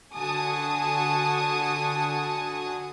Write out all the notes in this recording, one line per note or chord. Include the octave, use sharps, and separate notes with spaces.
D3 F#4 G#5 A5 D#6